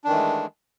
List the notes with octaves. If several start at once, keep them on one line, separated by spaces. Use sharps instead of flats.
D#3 E3 G#3 A3 D4